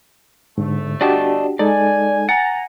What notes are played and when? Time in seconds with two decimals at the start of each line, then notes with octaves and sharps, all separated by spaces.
0.58 G1 G#2 D3 A3
1.01 D4 F#4 G4 D5 D#5 A5
1.59 G#3 D#4 A4 D5 G#5
2.29 F#5 G#5 A#5 A6